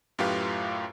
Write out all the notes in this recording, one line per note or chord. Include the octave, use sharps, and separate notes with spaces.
F#2 A2 F4 G4 B4 F5